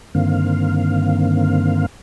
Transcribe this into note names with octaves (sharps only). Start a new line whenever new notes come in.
G2 D3 D#3 A#3 C4 F5